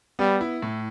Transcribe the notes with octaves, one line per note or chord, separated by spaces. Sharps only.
G3 B3
E4
A2